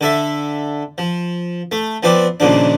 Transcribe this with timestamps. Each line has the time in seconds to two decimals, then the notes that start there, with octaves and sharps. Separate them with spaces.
0.01 D3 A4 E5
0.98 F3
1.72 A3
2.03 F3 B3 C4 D5
2.40 D#2 A#2 C#3 F3 D4